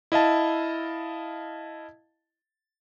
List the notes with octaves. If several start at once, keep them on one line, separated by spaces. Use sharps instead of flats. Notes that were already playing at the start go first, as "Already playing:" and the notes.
E4 D#5 F5 A5